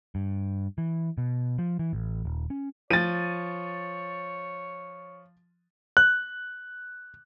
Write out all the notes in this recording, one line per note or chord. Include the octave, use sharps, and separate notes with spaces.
G2
E3
B2
F3
E3
A1
D#1
C#4
F3 C#5 A6 D#7
F#6